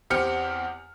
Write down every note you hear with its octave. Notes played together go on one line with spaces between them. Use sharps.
E2 C4 G4 F6 C#7